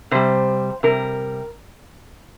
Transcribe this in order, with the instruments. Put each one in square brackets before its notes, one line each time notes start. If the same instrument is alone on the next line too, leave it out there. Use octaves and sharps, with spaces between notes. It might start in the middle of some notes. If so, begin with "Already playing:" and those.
[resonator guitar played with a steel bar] C3 G3 C5
C3 G3 A#4